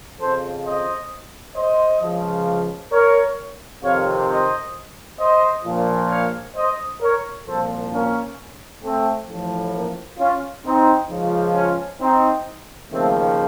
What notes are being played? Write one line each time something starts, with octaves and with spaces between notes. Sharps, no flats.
F2 C#3 F3 A4 C5
C5 D#5
C5 D#5
C#2 C#3 F3
A#4 C#5
F2 C3 D#3 C#5 F5
C5 D#5
C5 D#5
A#1 A#2 F3
C#5 F5
C5 D#5
A#4 C#5
C2 A#2 F3 A4 C5
A#3 C#4
A3 C4
A1 A2 F3
A#3
C#4 F4
C4 D#4
C#2 C#3 F3
C#4 F4
C4 D#4
D#2 C#3 F3 A3 C4